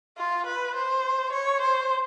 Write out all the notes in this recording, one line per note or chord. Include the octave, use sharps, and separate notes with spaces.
F4
B4
C5
C#5
C5